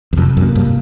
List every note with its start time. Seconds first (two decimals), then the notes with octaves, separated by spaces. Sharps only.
0.13 E2
0.17 F2 C3
0.37 F#2
0.42 A#3
0.56 G2